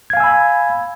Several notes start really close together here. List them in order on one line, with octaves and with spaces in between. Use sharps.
G#6 F5 G#5 E6 B5